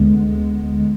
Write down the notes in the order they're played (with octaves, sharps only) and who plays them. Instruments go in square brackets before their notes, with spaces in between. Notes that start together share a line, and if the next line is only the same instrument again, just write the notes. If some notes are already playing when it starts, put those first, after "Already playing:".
Already playing: [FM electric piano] D2 D3 G#3 B3